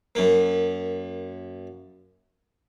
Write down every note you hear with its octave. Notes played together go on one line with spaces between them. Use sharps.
F#2 A#3